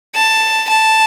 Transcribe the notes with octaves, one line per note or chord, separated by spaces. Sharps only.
A5
A5